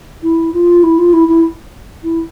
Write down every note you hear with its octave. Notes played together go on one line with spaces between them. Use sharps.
E4
F4
E4
F4
E4
E4
E4